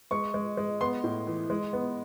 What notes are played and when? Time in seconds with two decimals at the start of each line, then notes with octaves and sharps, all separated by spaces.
0.11 G#3 C#6
0.34 G#3
0.57 G#3
0.81 B3 C6
1.04 A2
1.27 E3
1.50 G#3
1.73 B3